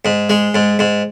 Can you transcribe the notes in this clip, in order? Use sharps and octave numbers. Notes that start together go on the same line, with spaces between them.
G#2
G#3
G#2
G#2